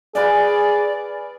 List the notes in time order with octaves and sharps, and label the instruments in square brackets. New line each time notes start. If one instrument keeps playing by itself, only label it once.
[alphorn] G#4 [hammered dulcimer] B4 F5 G#5 [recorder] D5